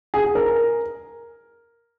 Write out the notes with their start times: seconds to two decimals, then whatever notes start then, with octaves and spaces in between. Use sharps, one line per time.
0.14 G#4
0.35 A#4